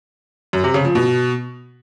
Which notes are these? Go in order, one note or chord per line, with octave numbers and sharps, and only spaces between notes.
F#2
C3
C#3
F3
B2